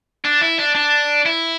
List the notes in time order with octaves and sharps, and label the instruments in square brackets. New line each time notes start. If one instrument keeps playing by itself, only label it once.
[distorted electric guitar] D4
E4
D4
D4
E4